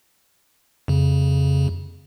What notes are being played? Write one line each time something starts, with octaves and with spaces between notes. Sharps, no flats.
F2 C#3